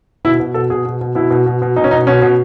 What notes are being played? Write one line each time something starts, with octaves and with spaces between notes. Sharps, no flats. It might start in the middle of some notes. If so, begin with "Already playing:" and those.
B2 E4
B2
B2 A4
B2 G#4
B2
B2
B2 E4
B2
B2
B2
B2 D#4
C#4
B2 D#4
B2 C#4
B2